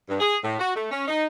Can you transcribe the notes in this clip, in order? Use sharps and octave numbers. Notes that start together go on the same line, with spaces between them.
G2
G#4
A2
F#4
A3
C#4
D#4